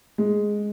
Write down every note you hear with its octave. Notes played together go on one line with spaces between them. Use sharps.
G#3